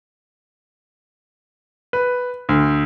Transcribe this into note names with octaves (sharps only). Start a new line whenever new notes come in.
B4
D2